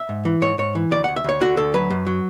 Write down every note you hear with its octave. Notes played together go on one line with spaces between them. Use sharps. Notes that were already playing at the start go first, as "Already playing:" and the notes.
Already playing: E5
G#2
E3
G#2 C#5
G#2 C#5
E3
D2 D5
D2 F#5
E5
D2 C#5
D3 F#4
D2 A4
F#3 B4
F#2
F#3